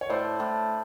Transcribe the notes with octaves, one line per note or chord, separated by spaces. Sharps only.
C#5
A2 C5 D5
A2